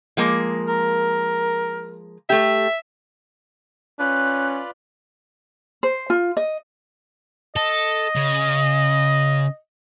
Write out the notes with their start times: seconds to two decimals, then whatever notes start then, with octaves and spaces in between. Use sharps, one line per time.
0.17 F3 G#3 A#3
0.69 A#4
2.30 A3 G4 E5
3.99 C#4 F4 B4 D5 F#6
5.83 C5
6.10 F4
6.37 D#5
7.56 A4 D#5
8.15 C#3